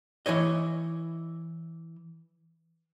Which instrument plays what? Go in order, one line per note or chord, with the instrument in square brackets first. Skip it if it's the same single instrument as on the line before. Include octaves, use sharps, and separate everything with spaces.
[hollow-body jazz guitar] E3 E4 C#5 D#5